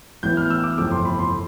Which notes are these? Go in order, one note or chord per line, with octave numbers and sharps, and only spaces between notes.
A1 A2 E3 B3 G6
F6
E6
D6
G1 F2 C3 F3 A3 D6
C6
B5
C6